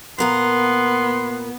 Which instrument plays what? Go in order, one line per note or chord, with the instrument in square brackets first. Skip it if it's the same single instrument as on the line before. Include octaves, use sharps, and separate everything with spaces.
[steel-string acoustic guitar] A#2 A#4 F5 [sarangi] B3 [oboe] C6